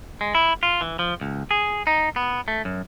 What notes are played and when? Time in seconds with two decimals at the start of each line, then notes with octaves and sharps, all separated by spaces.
0.21 G#3
0.35 E4
0.63 F4
0.81 E3
0.99 F3
1.21 C#2
1.51 G#4
1.87 D#4
2.16 B3
2.48 A3
2.65 F#2